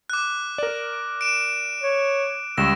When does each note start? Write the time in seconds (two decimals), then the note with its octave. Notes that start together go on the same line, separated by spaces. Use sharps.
0.10 D6 F#6
0.58 A#4 D5
1.21 D7 E7
1.82 C#5
2.58 C#2 G3 C#6 E6 A#6